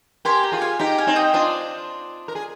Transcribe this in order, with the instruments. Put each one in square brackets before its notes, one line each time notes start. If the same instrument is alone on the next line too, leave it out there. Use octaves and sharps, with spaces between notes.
[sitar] G4 A#4 [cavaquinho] G#5 C6
[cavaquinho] G5 A#5
[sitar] F4 G#4
[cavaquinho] F5 G#5
[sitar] D#4 G4 [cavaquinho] G5 A#5
[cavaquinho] F5 G#5
[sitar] C4 D#4
[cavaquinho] D#5 G5
[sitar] D4 F4 [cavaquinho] C5 D#5
[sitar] A#4
G#4